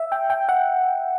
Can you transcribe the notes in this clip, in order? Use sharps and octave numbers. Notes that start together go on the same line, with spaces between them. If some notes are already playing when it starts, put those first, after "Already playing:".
Already playing: E5
G5
G5
F#5